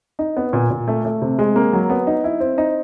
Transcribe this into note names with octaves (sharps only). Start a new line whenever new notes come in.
D#4
B3
A#2
A#2
A3
A3
C3
G#3
A#3
F#3
B3
D#4
E4
C4
D#4